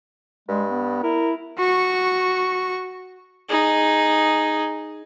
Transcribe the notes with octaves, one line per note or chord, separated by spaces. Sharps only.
G2 G#3
B3
E4 A#4
F#4 C#6
D#4 G#4